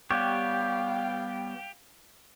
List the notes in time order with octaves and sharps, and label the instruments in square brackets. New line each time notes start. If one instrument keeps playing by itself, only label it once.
[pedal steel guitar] G3 B3 C#5 [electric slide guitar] G4 [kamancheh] F5 G5